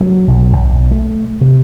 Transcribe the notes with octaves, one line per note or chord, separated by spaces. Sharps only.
F#3
B1
B1
A3
C3